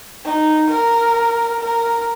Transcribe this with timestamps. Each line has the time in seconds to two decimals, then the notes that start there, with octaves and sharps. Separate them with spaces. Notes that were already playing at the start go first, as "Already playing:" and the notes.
0.25 D#4
0.70 A#4
1.60 A#4